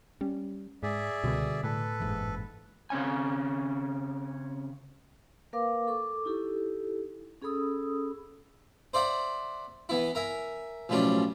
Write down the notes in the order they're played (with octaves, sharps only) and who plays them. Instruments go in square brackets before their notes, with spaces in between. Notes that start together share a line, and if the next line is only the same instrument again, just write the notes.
[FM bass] G3 [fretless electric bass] C#4
[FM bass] G#2 [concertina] G#4 D5 E5
[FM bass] C#2 [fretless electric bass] B2 D3 G3
[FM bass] A2 [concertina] A4 B4
[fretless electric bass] F#1 G#2 E3
[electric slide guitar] C#3 C4 C#4 G#5
[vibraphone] A#3 A#4 B4 F5 D6
A4 C#6 D6
D#4 E4 G4 A4
C#4 G#4 A4 B5 D#6 E6
[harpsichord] C5 D5 E5 F#5
E3 B3 E4
A#4 E5 G#5
B1 A2 F3 G3 C#4 D4